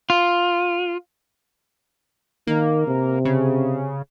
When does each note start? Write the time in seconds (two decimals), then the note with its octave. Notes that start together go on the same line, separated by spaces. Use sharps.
0.10 F4
2.47 D#3 A#3
2.87 C3
3.25 C#3